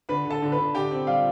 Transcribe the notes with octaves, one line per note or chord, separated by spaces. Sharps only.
D3 B4 B5
D3
A4 A5
D3
B4 B5
D3
D3 G4 G5
C4
G3 F4 F5